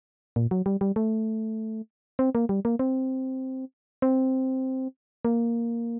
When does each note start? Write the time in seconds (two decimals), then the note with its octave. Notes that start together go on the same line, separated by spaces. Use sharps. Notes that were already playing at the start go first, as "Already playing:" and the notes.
0.36 A#2
0.51 F#3
0.66 G3
0.81 G3
0.96 A3
2.19 C4
2.35 A#3
2.49 G3
2.65 A#3
2.79 C4
4.02 C4
5.25 A#3